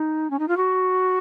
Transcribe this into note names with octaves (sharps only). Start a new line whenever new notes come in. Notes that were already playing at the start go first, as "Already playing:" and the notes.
Already playing: D#4
C#4
D#4
F4
F#4